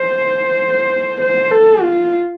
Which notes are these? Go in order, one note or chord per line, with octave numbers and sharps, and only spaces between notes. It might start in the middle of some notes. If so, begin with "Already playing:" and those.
Already playing: C5
C5
A4
F4